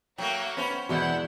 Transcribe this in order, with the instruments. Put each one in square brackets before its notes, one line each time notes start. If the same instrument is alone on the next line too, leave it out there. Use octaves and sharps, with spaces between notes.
[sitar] F#3 A3 A#3 [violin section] F#5 [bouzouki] G5
[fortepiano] B3 B5 [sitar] C#4 C5
[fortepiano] E2 B2 [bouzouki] G#3 D4 D5 [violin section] E4 F#5 G6